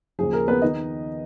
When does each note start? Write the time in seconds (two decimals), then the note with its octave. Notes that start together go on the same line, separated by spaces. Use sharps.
0.19 D#2 C#3 F3 G#4
0.33 A#4
0.48 B3 B4
0.62 D#3 D#4 D#5